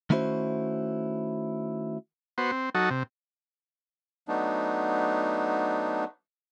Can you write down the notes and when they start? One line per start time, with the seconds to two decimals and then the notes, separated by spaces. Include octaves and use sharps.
0.10 D#3 A3 C#4 E4 F#4 C5
2.38 B3 F#4 C5
2.52 C4
2.75 F#3 D#4 F#4 A4
2.90 C3
4.28 F#3 A3 B3 D4 D#4